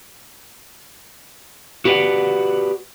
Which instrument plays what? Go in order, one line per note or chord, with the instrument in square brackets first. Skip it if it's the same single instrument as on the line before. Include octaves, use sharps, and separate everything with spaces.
[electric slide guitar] F#4 G4 B4 C5 D5 F#5